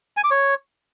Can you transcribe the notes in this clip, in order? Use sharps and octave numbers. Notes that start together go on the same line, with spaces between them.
G#5
D6
C#5